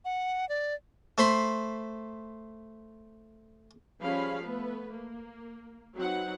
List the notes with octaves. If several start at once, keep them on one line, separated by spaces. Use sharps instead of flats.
F#5
D5
A3 C5 B5 C6
F3 G3 C#4 G#4 F5 B5
A3 B3 B4
A#3
F#3 C4 D#4 B4 F#5